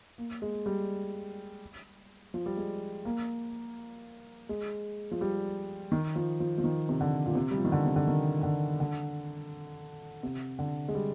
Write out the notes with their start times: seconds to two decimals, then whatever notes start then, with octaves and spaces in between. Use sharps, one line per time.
0.18 A#3
0.42 G#3
0.66 G3
2.34 F3
2.46 G3
2.57 G#3
3.05 A#3
4.49 G#3
5.11 F3
5.21 G3
5.92 D#3
6.16 F3
6.40 F3
6.58 F3
6.64 D#3
6.89 C3
7.01 D3
7.26 A#2
7.35 C3
7.51 G3
7.58 F3
7.65 D#3
7.72 D3
7.86 C3
7.96 D3
8.08 D#3
8.43 D3
8.80 D3
10.23 C3
10.59 D3
10.88 G#3
10.95 G3